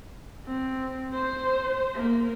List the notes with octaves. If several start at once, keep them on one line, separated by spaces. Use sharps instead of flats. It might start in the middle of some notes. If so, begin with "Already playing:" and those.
C4
C5
A#3